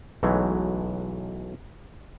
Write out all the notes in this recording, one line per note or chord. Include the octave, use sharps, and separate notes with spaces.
B1 E3 F#3 G#3 A3